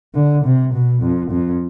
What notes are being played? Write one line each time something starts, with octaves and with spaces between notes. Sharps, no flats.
D3
C3
B2
F2
F2